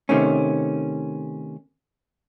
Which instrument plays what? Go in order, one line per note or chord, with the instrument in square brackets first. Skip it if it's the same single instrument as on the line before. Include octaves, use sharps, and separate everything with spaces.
[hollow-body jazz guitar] C3 D#3 A3 C#4